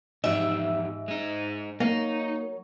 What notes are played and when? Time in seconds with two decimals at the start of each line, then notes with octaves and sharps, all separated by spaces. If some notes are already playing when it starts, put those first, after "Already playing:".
0.24 E2 G#2 F3 G4 E5
1.08 G#3 D#4
1.80 F#3 A#3 D#4